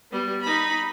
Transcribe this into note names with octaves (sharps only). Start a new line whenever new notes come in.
G3 B3
D#4 B5